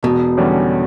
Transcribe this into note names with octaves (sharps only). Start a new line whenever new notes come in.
E1 B2
E2 D3 G3 C#4